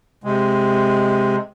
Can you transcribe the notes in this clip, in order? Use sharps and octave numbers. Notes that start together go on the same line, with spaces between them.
C3 G#3